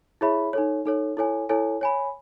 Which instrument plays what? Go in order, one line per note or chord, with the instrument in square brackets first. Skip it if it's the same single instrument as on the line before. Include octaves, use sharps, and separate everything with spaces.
[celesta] E4 G#4 C#5 E5 B5
D#4 A4 C#5
D#4 A4 C#5
E4 A4 C#5 G#5
E4 A4 C#5 G#5
C#5 G#5 B5